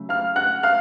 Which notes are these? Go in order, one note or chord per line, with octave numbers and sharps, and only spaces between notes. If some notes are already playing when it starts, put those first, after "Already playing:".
Already playing: C#3 F#3 A3
F5 F6
F#5 F#6
F5 F6